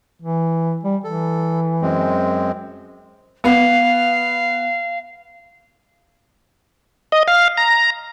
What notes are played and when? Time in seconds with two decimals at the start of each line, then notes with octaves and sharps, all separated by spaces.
0.22 E3
0.83 G3
1.04 E3 A4
1.82 F#2 G#3 C4
3.44 B3 F5
7.12 D#5
7.28 F5
7.58 A#5